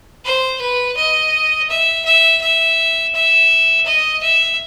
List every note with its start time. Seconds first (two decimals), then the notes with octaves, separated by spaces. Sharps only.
0.25 C5
0.61 B4
0.97 D#5
1.70 E5
2.05 E5
2.41 E5
3.15 E5
3.86 D#5
4.22 E5